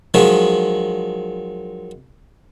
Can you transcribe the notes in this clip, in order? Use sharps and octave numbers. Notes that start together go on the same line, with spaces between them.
D#3 F3 F#3 G#3